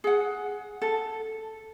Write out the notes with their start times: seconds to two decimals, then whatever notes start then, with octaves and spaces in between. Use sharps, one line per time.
0.04 G#4 F#5
0.82 A4